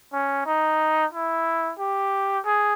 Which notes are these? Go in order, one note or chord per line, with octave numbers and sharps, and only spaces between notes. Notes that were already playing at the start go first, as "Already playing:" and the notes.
C#4
D#4
E4
G4
G#4